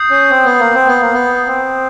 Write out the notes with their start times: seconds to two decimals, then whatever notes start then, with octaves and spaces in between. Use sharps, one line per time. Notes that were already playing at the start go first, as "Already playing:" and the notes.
Already playing: D#6 G6 C7
0.10 C#4
0.30 C4
0.45 B3
0.59 A#3
0.74 C4
0.87 B3
1.01 A#3
1.14 B3
1.47 C4